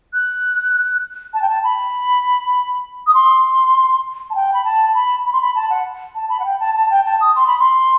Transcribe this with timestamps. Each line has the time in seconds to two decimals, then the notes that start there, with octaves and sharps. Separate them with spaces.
0.14 F#6
1.34 A5
1.42 G5
1.49 A5
1.64 B5
3.07 D#6
3.14 C6
4.30 A5
4.35 G5
4.54 B5
4.64 A5
4.95 B5
5.25 B5
5.33 C6
5.41 B5
5.55 A5
5.70 F#5
6.15 A5
6.30 B5
6.40 F#5
6.45 G5
6.60 A5
6.75 A5
6.90 G5
7.05 A5
7.21 D#6
7.36 C6
7.47 B5
7.59 C6